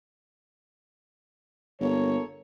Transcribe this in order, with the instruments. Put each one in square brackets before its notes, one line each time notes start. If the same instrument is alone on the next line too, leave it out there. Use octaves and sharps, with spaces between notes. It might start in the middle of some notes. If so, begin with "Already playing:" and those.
[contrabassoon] G1 [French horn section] A#3 A4 C#5